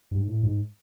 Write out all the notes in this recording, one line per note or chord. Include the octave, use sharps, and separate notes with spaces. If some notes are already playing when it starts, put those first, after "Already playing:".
G2
G#2
A2
G#2